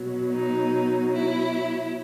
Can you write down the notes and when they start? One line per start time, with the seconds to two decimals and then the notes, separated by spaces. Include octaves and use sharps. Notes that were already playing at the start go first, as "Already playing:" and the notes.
Already playing: B2 F#3
0.32 D#4
1.12 E4